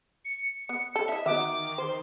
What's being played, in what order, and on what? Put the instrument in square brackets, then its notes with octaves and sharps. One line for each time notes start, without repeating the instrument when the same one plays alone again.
[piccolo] C#7
[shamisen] B3
A4
[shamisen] E4 D#5 [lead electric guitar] E5
[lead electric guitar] D#3 [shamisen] B3 F#4 E5 [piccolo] D6
[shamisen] C5 [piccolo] C6